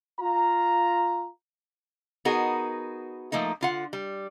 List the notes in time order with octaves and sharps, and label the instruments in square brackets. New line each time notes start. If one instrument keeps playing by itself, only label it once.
[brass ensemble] F4 A#5
[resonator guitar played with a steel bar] B3 D#4 F#4 G#4 A#4
F3 A3 A#3 D#4
D3 F4 F#5
G3